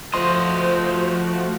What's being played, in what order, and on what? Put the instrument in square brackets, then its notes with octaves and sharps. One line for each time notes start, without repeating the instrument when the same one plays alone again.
[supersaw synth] F3 F#4 [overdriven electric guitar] A3 D#5 [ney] C5 [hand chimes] C6